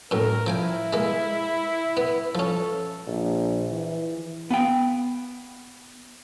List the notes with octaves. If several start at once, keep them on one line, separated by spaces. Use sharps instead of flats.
F#2 A2 A#4
F3 E4 G5 G#5
G#3 A#3
B3
F3 C#4 A4
A#1
E3
B3 F5 G5